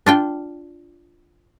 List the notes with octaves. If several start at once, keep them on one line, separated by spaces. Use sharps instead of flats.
D4 F4 G5